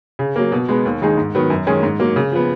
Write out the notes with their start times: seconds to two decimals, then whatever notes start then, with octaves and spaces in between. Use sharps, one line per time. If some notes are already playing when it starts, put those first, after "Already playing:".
0.19 C#3
0.36 F#3 A#3
0.52 B2
0.69 G#3 B3
0.85 D#2
1.02 D#3 G#3 D#4 G#4
1.18 G#2
1.35 D#3 F#3 B3
1.50 F#2
1.67 D#3 G#3 C#4 G#4
1.83 G#2
1.99 F#3 A#3
2.16 C#3
2.32 F3 B3